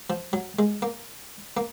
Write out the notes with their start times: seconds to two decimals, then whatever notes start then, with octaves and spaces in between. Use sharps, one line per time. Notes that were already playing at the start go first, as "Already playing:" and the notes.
0.10 F3
0.33 F#3
0.59 G#3
0.82 A#3
1.57 A#3